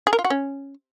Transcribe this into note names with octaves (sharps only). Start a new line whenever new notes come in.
G#4
A#4
F4
F#4
C#4